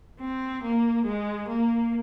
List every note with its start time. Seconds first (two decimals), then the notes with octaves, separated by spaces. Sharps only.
0.20 C4
0.63 A#3
1.05 G#3
1.49 A#3